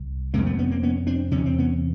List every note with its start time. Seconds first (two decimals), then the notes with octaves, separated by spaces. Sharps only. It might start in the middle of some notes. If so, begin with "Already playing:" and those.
Already playing: C2
0.34 C3 G#3 A#3
0.37 F2
0.46 A3 B3
0.59 B3 C#4
0.70 A#3 C4
0.83 B3 C#4
1.07 C4 D4
1.31 E2 C3 C#4
1.46 C4
1.59 B3 C#4